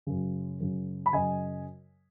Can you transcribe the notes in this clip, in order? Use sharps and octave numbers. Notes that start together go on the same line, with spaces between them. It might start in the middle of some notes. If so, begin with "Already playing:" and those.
F#2 C#3
F#2 C#3
B5
F#2 C#3 D#5 G#5